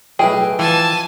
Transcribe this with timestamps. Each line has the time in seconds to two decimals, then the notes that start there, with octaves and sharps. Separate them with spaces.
0.19 B1 A2 E4 G#4 B4 G5
0.59 E3 F3 G#5 A5